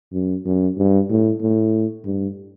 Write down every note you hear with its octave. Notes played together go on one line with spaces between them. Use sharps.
F#2
F#2
G2
A2
A2
G2